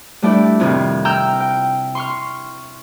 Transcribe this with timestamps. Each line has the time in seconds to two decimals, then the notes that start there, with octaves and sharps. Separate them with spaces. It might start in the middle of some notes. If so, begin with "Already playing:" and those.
0.22 G3 A3 D4 E4 G4 D5
0.60 F2 A2 C3 D#3
1.05 G5 A#5 E6 F6 G6
1.40 G5
1.95 C6 C#6 F6